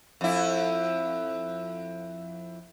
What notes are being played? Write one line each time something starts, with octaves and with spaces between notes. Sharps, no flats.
F2 E4